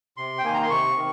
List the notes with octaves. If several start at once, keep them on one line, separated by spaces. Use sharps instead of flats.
C3 C6
G5
D#3 A#3 G#5
A#5
C6
C3 C#6
D#3